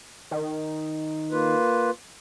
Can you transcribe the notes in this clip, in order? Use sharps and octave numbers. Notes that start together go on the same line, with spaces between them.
D#3
A#3 F4 B4